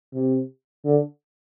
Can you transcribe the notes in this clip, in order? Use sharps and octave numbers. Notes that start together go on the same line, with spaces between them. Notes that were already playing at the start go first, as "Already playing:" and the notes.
C3
D3